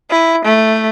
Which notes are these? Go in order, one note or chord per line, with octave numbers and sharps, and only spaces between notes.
E4
A3